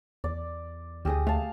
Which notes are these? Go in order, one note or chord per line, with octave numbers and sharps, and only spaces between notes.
E2 D5
D2 G4 G#4 D#6
A3 F5 A5